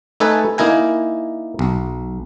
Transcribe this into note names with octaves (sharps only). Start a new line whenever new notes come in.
A3 D#4 A4 B4 G#5
A#3 D#4 E4 A#4 G#5
B1